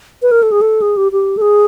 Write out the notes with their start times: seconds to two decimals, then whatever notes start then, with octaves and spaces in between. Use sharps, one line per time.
0.22 B4
0.31 A#4
0.43 A4
0.52 G#4
0.61 A4
0.82 G#4
0.97 G4
1.12 G4
1.37 A4
1.42 G#4